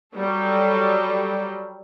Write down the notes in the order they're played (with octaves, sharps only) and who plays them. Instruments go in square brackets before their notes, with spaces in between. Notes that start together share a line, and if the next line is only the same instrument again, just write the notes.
[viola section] F#3 G3 A4